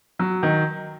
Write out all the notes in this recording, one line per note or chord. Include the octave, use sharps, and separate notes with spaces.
F#3
D#3